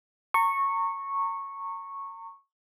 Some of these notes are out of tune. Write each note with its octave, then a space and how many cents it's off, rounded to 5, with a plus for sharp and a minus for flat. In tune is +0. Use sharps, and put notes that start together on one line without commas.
A#5 -35 C#6 -10